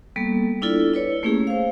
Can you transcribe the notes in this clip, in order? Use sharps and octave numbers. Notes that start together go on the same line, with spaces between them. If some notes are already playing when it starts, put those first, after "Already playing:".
G3 A#3 B3 A4
D4 E4 F4 A4 D5
E4 B4 C#5
A3 A#3 C#4 E4 G4 G#4
C5 F5